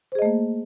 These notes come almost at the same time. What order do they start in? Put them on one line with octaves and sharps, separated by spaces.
C5 G#4 D#5 A3 A#3